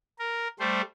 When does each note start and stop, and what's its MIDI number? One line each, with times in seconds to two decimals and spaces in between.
0.19 0.48 70
0.60 0.81 55
0.60 0.81 57
0.60 0.81 72